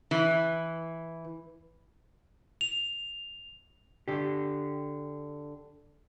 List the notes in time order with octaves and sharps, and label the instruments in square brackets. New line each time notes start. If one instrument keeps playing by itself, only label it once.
[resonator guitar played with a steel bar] E3
[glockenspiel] F7
[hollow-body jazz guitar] D3 G4